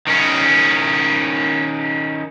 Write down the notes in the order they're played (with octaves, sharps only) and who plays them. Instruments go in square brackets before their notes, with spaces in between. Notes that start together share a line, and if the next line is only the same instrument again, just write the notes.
[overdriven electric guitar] D#3 C#4